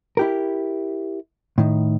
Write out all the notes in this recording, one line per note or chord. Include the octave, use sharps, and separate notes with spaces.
E4 G4 A#4
A2 D#3